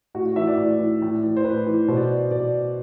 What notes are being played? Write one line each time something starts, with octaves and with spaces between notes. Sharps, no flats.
A2 F#4
F#4
E3 E5
D5
A2
E3
A2
E3
C5
A2 B4
E3
B2 C5
D5
C5
B2 D5